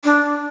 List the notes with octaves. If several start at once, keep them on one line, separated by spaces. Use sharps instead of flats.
D4